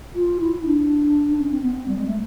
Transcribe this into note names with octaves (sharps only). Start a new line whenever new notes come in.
F4
E4
D4
C#4
C4
B3
C4
G3
G#3
A3